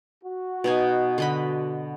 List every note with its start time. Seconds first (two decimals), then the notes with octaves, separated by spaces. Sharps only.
0.24 F#4
0.64 B2 D#4 G#5
1.18 D3 D#5 B5